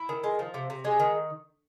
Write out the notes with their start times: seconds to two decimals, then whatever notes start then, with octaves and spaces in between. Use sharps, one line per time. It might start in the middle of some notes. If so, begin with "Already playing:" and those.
Already playing: E4
0.09 D#3
0.24 G#3
0.39 F3
0.54 C3
0.70 C3
0.85 G#3
1.00 D#3